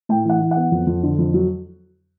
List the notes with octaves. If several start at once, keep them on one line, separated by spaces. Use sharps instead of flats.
A2 G5
E3 F#5
E3
F#5
B3
F2
F2
D3
F2
F#3